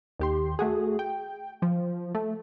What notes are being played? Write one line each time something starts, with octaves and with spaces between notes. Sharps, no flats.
D#2 G4 C6
A3 F#4 G#4
G5
F3
A3